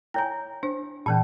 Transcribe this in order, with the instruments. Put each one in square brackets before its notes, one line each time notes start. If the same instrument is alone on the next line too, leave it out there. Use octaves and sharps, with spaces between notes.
[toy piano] E4 C#5 G#5 [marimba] G5 A#5
[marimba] D4 C5
[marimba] A#2 E3 [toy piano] C#4 D4 A5